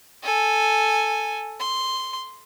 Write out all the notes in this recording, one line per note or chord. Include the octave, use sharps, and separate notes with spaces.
A4 G#5
C6